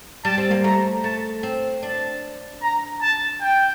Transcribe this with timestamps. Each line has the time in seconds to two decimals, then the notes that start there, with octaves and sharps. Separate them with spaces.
0.24 G3 A5
0.38 C4
0.51 A#3
0.64 A3 A#5
1.04 A3 A5
1.43 C4
1.83 D4 A5
2.62 A#5
3.01 A5
3.41 G5